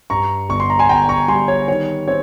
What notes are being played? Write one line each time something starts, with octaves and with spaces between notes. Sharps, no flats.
G2 A#5 C#6
G1 C#6
C6
A#5
G#5 C6
G1 G5 A#5
A#5 C#6
G3 G#5 C6
C#5
D#3 C#5
C4 C#5